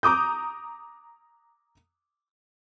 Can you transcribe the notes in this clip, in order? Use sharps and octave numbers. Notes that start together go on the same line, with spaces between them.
A#5 D6 D#6 G6